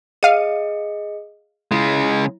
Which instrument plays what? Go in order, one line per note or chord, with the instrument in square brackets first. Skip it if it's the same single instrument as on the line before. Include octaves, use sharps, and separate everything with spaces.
[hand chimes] G#4 D#5 C#7 [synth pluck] F5 D#7
[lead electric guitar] C#3 G#3 [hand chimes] E4